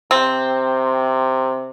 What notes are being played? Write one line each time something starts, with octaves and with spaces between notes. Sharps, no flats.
C3 C4